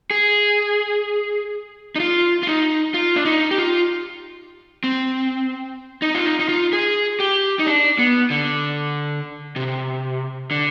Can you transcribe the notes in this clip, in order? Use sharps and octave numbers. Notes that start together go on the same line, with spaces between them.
G#4
D#4
F4
F4
D#4
F4
D4
D#4
G4
F4
C4
D#4
F4
D#4
D#4
F4
G#4
G4
D#4
D4
B3
D3
C3
D3